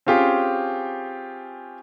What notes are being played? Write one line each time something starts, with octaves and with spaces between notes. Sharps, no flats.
C4 C#4 F4 G4 G#4